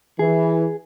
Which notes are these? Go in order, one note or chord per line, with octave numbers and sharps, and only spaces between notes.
E3 G#4